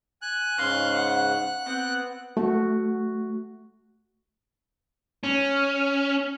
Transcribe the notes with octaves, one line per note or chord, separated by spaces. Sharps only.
G#5 F#6
G#2 C#3 F5 C6
F#5
B3 C4 F#5
A3 F#4
C#4